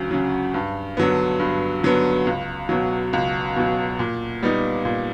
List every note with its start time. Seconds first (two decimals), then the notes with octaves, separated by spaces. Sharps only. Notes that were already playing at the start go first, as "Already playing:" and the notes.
Already playing: D2 C#3 F#3
0.11 C#3 F#3
0.54 G2
0.97 D3 F#3 B3
1.40 G2
1.83 D3 F#3 B3
2.27 C#2
2.69 B2 F#3
3.13 C#2
3.56 B2 F#3
3.99 A#2
4.43 G3 B3 D#4
4.85 A#2